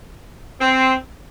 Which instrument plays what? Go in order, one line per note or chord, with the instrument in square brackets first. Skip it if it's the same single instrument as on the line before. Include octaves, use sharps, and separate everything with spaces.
[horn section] C4